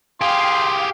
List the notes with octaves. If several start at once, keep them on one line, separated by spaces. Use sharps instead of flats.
G4 G#4 F5 G5 C6